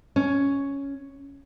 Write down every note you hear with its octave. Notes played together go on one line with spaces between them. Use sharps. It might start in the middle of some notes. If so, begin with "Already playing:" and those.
C#4